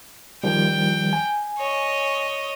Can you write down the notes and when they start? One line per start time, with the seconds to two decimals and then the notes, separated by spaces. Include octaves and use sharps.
0.44 D#3 F3 G3 G5
1.13 G#5
1.58 C#5 D#5